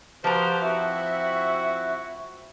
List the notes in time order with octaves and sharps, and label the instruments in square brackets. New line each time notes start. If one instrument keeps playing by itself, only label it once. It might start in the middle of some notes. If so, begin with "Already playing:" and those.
[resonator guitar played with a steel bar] F3 A#5 [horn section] F#4 G4 C5 [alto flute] B4
[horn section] C4 E4 F#4 [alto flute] E5